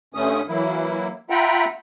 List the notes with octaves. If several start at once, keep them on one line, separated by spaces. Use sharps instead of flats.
G2 D3 A3 C#4 D#6
E3 F#3 A#3 E4
F4 E5 F#5 G5 A#5 B5